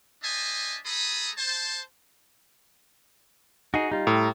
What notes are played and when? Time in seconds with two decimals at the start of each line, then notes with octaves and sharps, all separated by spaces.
0.22 D4 C5 D#5 E5 G#5 A5
0.85 A3 G#4 A4 A#5 B5 D#6
1.37 C5 A5
3.74 D#4 F#4 G#4
3.91 G3 D#4 F4
4.07 A2 A#5 E6